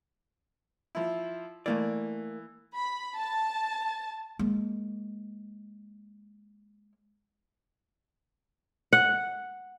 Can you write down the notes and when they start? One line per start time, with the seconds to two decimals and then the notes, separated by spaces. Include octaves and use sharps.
0.95 F3 E4
1.66 E3 A3 A#3 D5
2.76 B5
3.18 A5
4.39 G#3 A#3
8.93 F#5